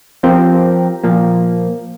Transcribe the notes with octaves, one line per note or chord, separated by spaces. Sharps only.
F3 C4 G4 A#4
A#2 F3 A#3